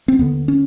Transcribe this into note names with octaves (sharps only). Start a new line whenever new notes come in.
C4
D#2 D3 B3
C#4